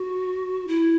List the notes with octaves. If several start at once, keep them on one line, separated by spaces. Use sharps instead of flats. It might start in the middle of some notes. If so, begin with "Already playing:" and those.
Already playing: F#4
E4